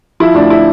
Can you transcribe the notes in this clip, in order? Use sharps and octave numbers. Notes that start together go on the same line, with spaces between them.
F3 E4
D2 D4
E4